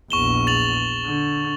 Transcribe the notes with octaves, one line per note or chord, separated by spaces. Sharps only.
A#1 E2 C#6 E7 G7
A6 F7 F#7
D3